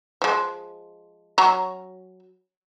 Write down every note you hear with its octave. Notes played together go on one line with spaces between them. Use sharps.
F3 G#3
F#3 C#4 A#5